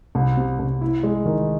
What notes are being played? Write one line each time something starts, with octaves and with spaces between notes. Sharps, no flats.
C2
C3
C2
E4
G#3
D#3